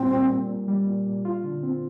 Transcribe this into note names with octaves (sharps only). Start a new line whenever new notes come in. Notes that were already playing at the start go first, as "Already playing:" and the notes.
Already playing: A#2 G3 C4
A#2
A#2
A#2
G3
A#2
A#2
F4
D3
C4